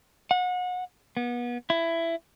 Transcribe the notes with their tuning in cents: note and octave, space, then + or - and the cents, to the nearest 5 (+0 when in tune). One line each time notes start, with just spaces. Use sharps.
F#5 -30
B3 -30
E4 +15